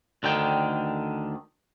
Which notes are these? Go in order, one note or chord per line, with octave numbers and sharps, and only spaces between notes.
D2 D3 D#3 G5